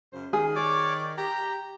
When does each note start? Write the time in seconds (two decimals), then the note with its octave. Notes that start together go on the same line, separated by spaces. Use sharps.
0.13 F#2 C#3 C5
0.33 D#3 G#4
0.56 C#5 D5 D6
1.18 G4 A#5